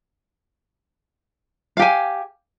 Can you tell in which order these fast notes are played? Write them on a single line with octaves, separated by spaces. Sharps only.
F5 G4 G#5